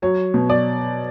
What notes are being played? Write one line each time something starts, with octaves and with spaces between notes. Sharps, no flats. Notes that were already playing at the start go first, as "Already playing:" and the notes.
F#3 C#5
B2
D5